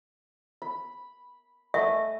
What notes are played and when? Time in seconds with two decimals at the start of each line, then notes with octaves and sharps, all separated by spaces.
0.62 B5
1.74 A3 D#5 E5 G#5